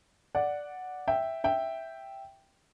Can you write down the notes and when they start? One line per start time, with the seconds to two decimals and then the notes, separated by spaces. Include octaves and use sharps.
0.35 D5 F#5
1.08 E5 G5
1.44 E5 G5